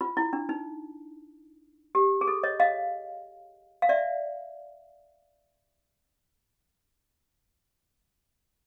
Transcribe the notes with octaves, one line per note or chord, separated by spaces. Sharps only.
F4
E4
D4
D#4
G4
G#4
A4
C#5 D#5
D#5 F5
F5
D5 E5